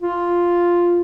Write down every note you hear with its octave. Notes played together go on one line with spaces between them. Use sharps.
F4